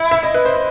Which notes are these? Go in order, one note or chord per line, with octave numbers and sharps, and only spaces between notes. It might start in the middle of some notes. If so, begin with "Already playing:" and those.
Already playing: E4
E5
D#5
B4
C5